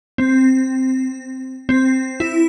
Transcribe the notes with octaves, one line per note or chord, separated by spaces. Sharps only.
C4
C4
E4